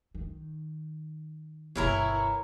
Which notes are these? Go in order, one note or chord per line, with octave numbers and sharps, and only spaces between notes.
D#3
G1 B2 E3 E4 A#4 C#5 A#5